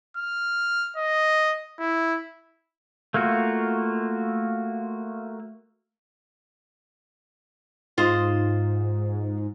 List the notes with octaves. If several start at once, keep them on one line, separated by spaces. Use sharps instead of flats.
F6
D#5
E4
A3 A#3 F4 F#4
G#2 F4 C5 D#5